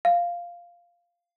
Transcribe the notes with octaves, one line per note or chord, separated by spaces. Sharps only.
F5